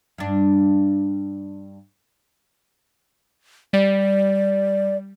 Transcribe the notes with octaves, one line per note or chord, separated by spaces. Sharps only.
G2 D4
G3 D5